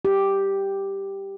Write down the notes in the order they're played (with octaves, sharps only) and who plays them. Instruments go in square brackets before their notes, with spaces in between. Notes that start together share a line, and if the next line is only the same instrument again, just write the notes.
[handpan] G4